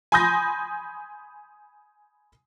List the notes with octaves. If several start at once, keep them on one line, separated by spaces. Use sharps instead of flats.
G#5 B5 C6 D#6 G6 A#6